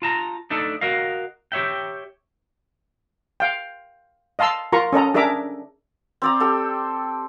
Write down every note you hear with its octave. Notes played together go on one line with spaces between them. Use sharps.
F4 A5 A#5
A3 D4 D#4 A4
F#4 A#4 D#5 F5
G4 C#5 E5 G5
F5 G5
D#5 F5 A5 C6 E6
F4 A#4 A#5 C6 C#6
C#4 A4 D#5 A#5
D4 G#4 A#4 E5 A#5 D6
C4 D5 A#5
G4 A4 G5